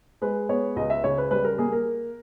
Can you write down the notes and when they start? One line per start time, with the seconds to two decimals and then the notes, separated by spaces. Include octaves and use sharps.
0.22 G#3 B4
0.49 B3 C#5
0.76 C#2 D#5
0.90 E5
1.04 C#3 C#5
1.18 B4
1.31 G3 B4
1.44 A#4
1.58 A#3 G#4
1.72 A#4